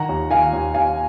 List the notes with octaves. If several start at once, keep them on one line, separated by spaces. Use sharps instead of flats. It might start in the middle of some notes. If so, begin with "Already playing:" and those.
Already playing: D#3 F#5 A#5
D#2
D#3 F5 G#5
D#2
D#2 F5 G#5